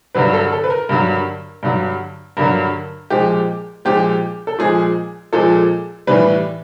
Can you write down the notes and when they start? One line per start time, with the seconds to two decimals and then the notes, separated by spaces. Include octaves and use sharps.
0.15 G2 D3 F#3 B4
0.33 A4
0.52 A4
0.64 B4
0.70 A#4
0.89 G2 D3 F#3
1.63 G2 D3 F#3
2.37 G2 D3 F#3 A#4
3.10 A#2 F3 G#3 G4
3.85 A#2 F3 G#3 G4
4.47 A4
4.58 A#2 F3 G#3 G#4
5.33 A#2 F3 G#3 A4
6.07 A2 E3 G3 B4